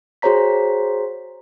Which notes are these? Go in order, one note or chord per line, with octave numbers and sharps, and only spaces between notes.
F#4 G#4 C5 C#5 A#5 B6